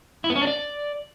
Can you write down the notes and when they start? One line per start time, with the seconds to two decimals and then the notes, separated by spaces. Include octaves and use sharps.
0.24 E4
0.30 B3
0.36 C#4
0.41 D4
0.47 D5